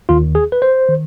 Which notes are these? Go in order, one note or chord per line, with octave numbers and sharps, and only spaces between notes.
D#2 D#3 F4
G#4
B4
C5
D#3